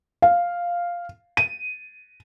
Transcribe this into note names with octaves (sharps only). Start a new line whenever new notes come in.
F5
D#7